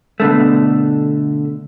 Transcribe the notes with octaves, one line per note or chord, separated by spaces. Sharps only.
B2 D3 A3